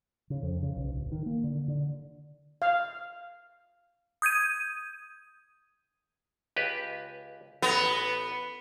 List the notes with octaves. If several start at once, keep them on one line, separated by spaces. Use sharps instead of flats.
C#3
F2
C#3
B1
D1
D#3
A#3
D3
D3
F5
D#6 G6 G#6 D#7
C#2 G4 B4
A1 B3 A#5